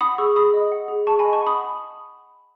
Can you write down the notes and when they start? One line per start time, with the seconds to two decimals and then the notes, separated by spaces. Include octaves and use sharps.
0.01 F#5 B5 D#6
0.18 G#4 C#6 E6
0.36 G#4 B5 D#6
0.54 D#5
0.72 F#5
0.88 G#4
1.07 G#4 A5 C#6
1.19 G#5 B5
1.25 D#5
1.33 A5 C#6
1.42 F#5 B5 D#6